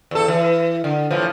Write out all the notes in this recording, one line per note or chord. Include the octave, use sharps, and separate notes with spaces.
E2 A4
E3
D3
A2 E3 F3